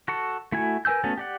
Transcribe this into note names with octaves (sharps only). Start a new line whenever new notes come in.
F#4 A4 C#6
A3 E4 F#4 G#5
A#4 B4 G#5 E6 G6
A3 B3 C#4 F#4 A4
G4 D5 F#5